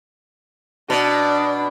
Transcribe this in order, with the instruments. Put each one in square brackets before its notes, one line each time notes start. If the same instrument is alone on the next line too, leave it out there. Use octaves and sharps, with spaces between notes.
[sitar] B2 [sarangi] D4